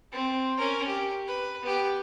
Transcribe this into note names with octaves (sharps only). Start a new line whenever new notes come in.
C4
C#4 A#4
G4
B4
B3 G4